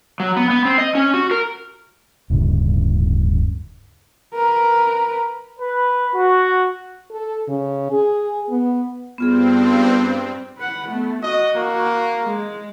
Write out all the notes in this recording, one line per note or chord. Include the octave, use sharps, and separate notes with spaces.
F#3
B3
B3
C4
D#5
C#4
F#4
A#4
D1 G2 C#3
A#4 B4
B4
F#4
A4
C#3
G#4
B3
G2 B3 C4 F4 G#4
B4 F#5
A3 B3
F#4 D#5
A#3
G#3